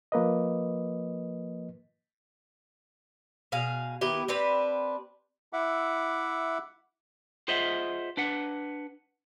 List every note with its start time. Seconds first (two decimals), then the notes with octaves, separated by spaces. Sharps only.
0.12 F3 A#3 B4 D#5
3.52 B2 G#4 F5
4.01 D#3 B3 E4 G4
4.28 C4 D4 G4 B4
5.53 E4 E5 F#5 D6
7.48 F4 G#4 C5 D#5 E5 F#5
8.17 D4 B4 F#5